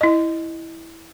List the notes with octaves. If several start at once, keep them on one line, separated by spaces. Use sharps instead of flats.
E4 D#5